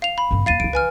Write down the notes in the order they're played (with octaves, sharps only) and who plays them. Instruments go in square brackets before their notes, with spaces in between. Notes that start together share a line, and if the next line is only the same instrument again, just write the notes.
[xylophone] F5 F7
B5
[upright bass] G1 C#3
[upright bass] D#2 A#3 [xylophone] F5 A6 D#7
[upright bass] C#2 E3 [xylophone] D7
[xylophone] B4 G#5 F6